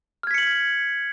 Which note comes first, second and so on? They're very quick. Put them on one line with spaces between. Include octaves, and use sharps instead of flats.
F6 G#6 B6 C#7 F#7